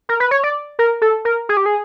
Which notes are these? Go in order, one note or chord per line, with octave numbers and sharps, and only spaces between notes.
A#4
B4
C#5
D5
A#4
A4
A#4
G#4
G4
G#4